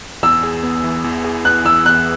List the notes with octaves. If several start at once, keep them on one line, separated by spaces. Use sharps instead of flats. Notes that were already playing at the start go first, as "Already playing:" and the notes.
E2 E6
G#4
B3
E3
E2
G#4
B3 F#6
E3 E6
E2 F#6